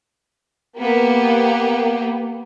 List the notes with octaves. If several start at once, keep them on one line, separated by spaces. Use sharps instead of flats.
A#3 B3 G4